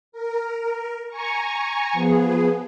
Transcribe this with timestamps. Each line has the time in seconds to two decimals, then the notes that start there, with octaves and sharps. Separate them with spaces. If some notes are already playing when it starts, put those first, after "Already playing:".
0.12 A#4
1.08 G#5 A#5 C#6
1.93 F3 B3 G#4